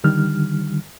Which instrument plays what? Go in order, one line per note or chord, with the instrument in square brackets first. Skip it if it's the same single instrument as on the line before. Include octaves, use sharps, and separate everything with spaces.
[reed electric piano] D3 D#3 G3 F6